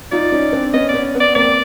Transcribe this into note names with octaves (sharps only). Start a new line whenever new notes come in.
D#4 F4 D5
C#4 D#4
C4 D4
B3 C#4 D#5
D5
B3 C#4
B3
D5
A#3 C4 D5